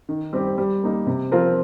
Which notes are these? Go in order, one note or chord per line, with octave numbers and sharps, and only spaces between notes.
D#3
G3 C4 G4
G3
A#3 D#4
C3
F3 C4 F4 A#4